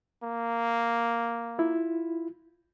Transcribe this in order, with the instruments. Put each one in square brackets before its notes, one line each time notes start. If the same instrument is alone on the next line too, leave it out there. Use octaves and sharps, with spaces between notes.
[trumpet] A#3
[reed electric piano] E4 F4